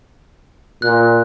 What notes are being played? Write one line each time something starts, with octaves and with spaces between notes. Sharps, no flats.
A#2 F#6